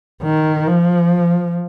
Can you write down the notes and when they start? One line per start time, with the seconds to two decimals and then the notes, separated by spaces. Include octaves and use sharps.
0.22 D#3
0.67 F3